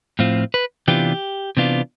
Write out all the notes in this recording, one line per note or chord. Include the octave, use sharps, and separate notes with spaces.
A2 F3 C4 F4
B4
C3 E3 B3 D4 F4 G4
C3 E3 B3 D4 F4